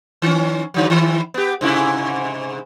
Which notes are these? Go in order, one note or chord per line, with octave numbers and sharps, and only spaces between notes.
D#3 C#4
G#2 D3 F#3
D#3 E4
B3 G4
G#2 C3 E4